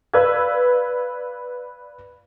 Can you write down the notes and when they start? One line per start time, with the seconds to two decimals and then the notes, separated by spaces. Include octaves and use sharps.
0.14 B4 D5 F5 E6 G#6